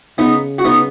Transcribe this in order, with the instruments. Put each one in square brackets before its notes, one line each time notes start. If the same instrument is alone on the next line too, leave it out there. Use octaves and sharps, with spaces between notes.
[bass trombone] C#3 [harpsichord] B3 D#4
[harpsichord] F#4
B3 D#4